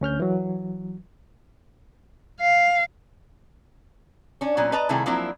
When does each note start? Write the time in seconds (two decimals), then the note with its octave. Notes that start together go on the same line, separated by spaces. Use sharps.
0.01 D2 C#4 F6 G6
0.20 E3 F#3
2.40 F5
4.41 C#4 D4
4.57 A#2 F#3 B3 C#4
4.72 B4 D5 D#5 A5 A#5
4.89 C3 D#3 G3 A3 E4 G#4
5.06 F3 F#3 A#3 C4 D4 E4